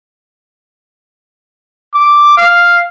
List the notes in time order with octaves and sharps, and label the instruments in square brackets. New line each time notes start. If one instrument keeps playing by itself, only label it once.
[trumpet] D6
F5